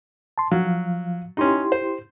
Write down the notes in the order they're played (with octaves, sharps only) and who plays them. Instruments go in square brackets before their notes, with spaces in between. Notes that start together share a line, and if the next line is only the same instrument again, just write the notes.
[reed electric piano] A5 C6
[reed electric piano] F3 F5 [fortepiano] F#3
[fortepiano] C#4 D#4 [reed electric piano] E4 G4 C6
[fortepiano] C5